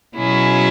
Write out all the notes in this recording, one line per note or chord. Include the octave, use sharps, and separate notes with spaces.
B2 F#3 C#4 E4 G#4